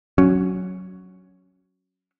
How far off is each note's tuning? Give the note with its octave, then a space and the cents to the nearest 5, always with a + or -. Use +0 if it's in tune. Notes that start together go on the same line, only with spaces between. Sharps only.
F#3 +0 C#4 +0